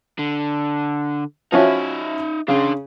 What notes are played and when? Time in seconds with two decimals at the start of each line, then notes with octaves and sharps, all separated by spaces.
0.19 D3
1.52 F3 C#4 D#4 F#4 E5
2.48 C#3 D4 C6